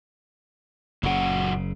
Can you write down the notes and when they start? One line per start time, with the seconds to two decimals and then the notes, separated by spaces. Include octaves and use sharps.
1.03 F#1 A#2 C#3 F#3 F#5